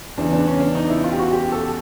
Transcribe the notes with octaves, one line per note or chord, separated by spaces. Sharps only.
E2 C#3 E3 D4
D4
C#4
D4
D#4
E4
F4
G4
F#4
G4
A4